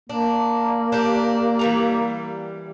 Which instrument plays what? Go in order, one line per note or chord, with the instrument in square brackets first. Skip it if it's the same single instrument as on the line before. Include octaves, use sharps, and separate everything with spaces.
[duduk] A#3 [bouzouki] D4
[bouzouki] D4 G4 A#4
E3 G3 A#5